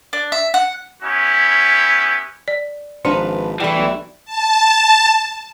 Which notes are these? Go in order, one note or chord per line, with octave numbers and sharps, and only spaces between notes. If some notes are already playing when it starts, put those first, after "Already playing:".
D4
E5
F#5
B3 C#4 E4 G4
D5
G#1 F3 D4 B4 A#5
E3 G3 A3 E4
B1
A5